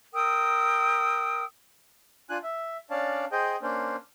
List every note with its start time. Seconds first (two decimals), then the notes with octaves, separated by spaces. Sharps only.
0.14 A#4 G5 D#6 E6
2.29 D4 F4 G#5 F#6
2.43 E5
2.90 C#4 D4 C#5 D5 F5 A5
3.32 G#4 C5 D#5 G5
3.62 A#3 C#4 D4 C5